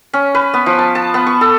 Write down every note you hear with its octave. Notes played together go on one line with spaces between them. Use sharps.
C#4
B4
B3
F3
A5
A5
B3
C#6
A4